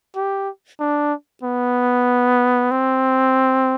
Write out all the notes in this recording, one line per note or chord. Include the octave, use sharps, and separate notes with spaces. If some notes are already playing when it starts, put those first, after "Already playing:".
G4
D4
B3
C4